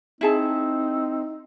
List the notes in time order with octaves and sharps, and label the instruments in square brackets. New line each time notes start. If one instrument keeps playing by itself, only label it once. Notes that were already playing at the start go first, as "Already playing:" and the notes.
[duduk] C4 [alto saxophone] D#4 [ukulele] E4 G#4 A5